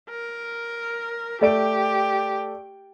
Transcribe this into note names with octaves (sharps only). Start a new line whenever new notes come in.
A#4
A3 G4 D5 D7